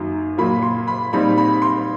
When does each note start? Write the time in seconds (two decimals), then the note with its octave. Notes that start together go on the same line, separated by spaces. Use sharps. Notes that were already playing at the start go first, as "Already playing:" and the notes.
Already playing: F#2 D#3 F#3 A#3
0.38 A#2 F#3 A#3 B5
0.62 C6
0.88 B5
1.12 A#2 G3 C4 D#4 B5
1.38 B5
1.62 C6